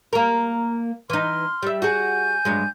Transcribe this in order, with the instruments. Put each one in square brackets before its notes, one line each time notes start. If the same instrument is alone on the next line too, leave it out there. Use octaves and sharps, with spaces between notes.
[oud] A#3 A#4
[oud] E3 D#4 [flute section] C6 F6
[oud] G3 E5
[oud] F#4 G#4 [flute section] G#5 G6
[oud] G2 F#3 G#3